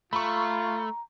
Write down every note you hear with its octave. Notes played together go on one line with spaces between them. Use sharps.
A3 F4 A#5 B5 C#6